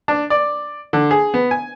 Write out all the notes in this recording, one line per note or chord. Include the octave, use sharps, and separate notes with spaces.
D4
D5
D3
G#4
B3
G#5